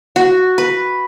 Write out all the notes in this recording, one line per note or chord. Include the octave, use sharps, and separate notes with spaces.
F#4
B4